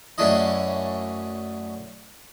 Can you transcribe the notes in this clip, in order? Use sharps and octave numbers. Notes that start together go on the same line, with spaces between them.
F#2 A3 C#4 D4 E4 D#5